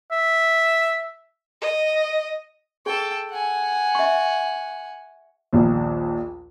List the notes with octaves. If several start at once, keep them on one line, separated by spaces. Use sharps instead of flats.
E5
D#5
G#4 A4 G5
F#5 G#5
E5 C#6
A#1 D#2